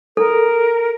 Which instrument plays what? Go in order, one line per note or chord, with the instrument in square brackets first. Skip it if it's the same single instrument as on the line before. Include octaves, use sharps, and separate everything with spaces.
[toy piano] A4 [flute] A#4